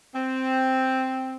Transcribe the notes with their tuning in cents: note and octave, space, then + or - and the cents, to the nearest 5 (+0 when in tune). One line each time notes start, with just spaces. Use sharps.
C4 +0